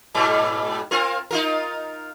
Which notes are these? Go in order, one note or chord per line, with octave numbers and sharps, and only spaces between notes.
G#2 B2 G3
C4 F4 A#4
D#4 F4 A#4